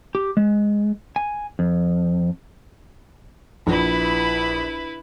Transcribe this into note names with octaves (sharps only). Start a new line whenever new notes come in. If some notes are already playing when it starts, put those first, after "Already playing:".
G4
G#3
G#5
F2
A#1 E4 B4